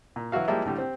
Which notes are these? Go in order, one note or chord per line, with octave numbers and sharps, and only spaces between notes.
A#2
E3 F#3 E4 F#4 F5
F3 G3 G#3 A#3 E4
A2 D3 G3
C4 G4